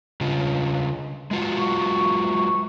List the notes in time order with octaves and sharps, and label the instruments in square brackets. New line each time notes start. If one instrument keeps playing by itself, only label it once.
[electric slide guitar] C#3 D4 F4
G#3 F4 F#4
[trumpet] C#6